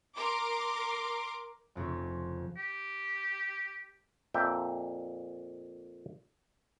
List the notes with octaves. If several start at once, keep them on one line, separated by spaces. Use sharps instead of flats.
A#4 C6 D6
F1 F2 C#3
G4
F2 A#2 E5 G5